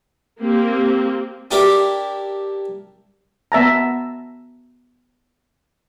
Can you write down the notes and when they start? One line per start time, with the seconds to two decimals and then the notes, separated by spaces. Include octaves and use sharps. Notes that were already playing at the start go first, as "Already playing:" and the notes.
0.41 A#3 C4 G4
1.51 D4 E4 G4 A#4
3.52 B3 E5 A5 A#5